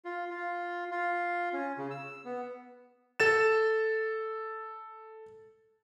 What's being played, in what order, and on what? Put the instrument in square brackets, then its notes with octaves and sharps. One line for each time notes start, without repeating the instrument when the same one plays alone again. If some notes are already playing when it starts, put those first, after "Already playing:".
[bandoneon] F4
F4
F4
C#4
C#3
E6
B3
[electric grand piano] A4 A6 E7